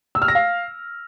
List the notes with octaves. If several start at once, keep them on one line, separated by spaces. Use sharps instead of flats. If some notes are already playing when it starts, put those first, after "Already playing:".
E6
F6
A#6
F5